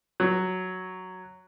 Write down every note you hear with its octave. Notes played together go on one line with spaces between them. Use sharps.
F#3